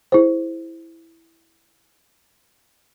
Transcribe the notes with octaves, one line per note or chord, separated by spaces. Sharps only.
E4 G#4 C5